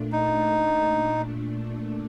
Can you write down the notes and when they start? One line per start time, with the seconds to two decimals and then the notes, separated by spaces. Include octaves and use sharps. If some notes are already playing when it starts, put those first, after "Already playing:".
Already playing: A#2 A3 D4
0.12 D#4